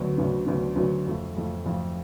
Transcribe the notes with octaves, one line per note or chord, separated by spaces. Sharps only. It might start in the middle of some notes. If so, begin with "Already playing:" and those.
Already playing: D2 D3 F#3 B3
D2 D3 F#3 B3
D2 D3 F#3 B3
D2 D3 F#3 B3
F2 F3 A3
F2 F3 A3
F2 F3 A3